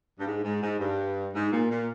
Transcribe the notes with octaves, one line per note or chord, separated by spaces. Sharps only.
G2
G#2
G#2
G#2
G2
G#2
A#2
A#2